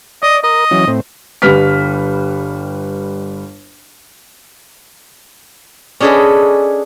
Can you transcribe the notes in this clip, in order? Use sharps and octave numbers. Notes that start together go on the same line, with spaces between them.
D5 D#5
A#4 D#5
E3 F#3 C#4
A2 C4
G1 G3 B4 F6 B6
C#4 D4 G#4 A4 B4 D#5